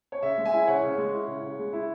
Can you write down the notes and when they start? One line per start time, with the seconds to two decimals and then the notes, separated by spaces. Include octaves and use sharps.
0.12 C#5
0.22 C#3 E5
0.38 G#3
0.45 E5 G#5
0.53 E4
0.67 C#3 C#5 F#5
0.83 C#3
0.98 G#3
1.14 E4
1.28 C#3
1.43 C#3
1.59 G#3
1.73 E4